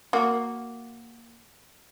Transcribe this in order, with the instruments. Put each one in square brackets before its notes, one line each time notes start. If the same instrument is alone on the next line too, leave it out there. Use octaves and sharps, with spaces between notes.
[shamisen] A#3 F#4